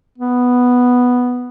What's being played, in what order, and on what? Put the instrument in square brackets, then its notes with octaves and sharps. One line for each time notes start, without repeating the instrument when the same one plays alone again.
[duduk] B3